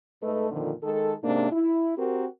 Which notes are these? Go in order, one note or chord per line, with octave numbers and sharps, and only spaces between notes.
G#2 A3 A4 B4 D#5
F2 A#2 D3 D#3 F3
D#3 G#3 A4
G#2 C3 A#3 C#4 D4
E4
C4 F#4 G4 A#4